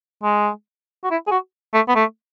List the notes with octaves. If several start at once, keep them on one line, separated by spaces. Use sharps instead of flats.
G#3
F#4
E4
G#4
F#4
A3
B3
A3